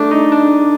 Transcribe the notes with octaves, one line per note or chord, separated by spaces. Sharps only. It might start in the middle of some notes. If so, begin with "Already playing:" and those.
Already playing: A3 D4
D#4
D4